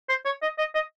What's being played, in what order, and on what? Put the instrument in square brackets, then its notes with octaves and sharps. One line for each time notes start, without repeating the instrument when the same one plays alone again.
[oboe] C5
C#5
D#5
D#5
D#5